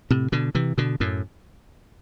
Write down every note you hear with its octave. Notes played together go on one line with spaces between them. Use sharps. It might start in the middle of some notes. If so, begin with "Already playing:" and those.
A2 C3
B2 D3
C3 E3
B2 D3
F#2 A2